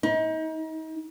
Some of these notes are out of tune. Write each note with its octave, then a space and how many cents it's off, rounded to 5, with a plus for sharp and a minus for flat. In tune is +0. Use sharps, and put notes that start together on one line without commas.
D#4 +35